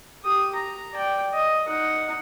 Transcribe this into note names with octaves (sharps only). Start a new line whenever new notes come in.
G4 D#6
A#5
D5 G5
D#5
D#4 F#5